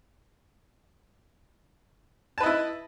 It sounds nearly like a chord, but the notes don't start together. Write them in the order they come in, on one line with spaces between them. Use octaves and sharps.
A5 B4 D#5 E4